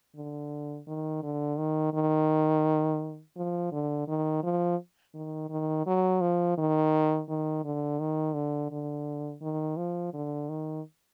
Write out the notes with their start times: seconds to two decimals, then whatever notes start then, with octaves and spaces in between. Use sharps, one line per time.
0.16 D3
0.87 D#3
1.23 D3
1.58 D#3
1.93 D#3
3.36 F3
3.72 D3
4.08 D#3
4.43 F3
5.14 D#3
5.50 D#3
5.86 F#3
6.21 F3
6.57 D#3
7.29 D#3
7.64 D3
7.99 D#3
8.34 D3
8.71 D3
9.42 D#3
9.77 F3
10.13 D3
10.49 D#3